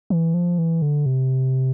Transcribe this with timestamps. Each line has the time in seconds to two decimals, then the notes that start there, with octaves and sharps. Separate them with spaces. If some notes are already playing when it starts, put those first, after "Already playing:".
0.10 E3
0.34 F3
0.58 E3
0.82 D3
1.06 C3